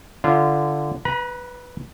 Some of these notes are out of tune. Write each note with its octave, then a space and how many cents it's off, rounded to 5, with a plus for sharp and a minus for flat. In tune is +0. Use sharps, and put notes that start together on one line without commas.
D3 +0 F4 -25
B4 +0 A#5 +45